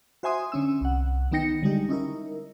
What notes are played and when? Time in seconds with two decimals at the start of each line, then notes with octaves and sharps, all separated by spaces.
0.23 F#4 C5 E5 G#5 C6 D#6
0.52 D3 C#4 E6
0.81 C2 F#5
1.32 D#3 B3 D#4 G5 A#6 C#7
1.63 D3 G3 G#3 D#4 G4
1.89 C#4 D#4 E4 A#4